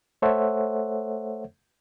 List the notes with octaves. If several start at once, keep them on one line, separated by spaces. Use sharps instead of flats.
A3 A4 C5 C#5 E5 F#5